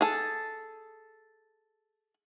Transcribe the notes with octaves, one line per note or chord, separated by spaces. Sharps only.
G#4 A4